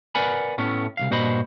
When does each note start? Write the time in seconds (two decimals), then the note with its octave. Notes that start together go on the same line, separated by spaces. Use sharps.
0.15 A#4 B4 D5 F#5 G#5 B5
0.58 A2 A3 B3 C#4
0.97 C2 F2 F5
1.10 G2 A#2 F#4 C5 D#5 B5